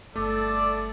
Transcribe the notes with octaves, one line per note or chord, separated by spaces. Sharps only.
G1 A3 A4 D5